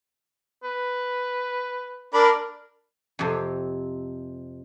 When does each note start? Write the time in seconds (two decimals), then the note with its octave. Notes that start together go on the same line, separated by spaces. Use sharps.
0.64 B4
2.14 D4 A#4 B5
3.19 F2 C3